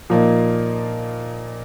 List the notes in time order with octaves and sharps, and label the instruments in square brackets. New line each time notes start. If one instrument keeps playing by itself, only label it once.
[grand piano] A#2 A#3 D#4 [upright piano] F3